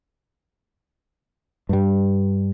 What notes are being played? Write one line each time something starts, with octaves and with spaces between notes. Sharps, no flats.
G2 G3